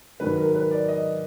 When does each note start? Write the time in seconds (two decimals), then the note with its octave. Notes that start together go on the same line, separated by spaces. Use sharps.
0.20 G#2 D#3 F#3 B4
0.37 A#4
0.55 B4
0.71 D5
0.88 D#5